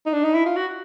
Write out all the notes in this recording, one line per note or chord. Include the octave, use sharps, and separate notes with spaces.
D#4
D4
D#4
E4
F4
F#4